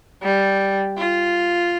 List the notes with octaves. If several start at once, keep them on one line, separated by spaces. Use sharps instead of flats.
G3
F4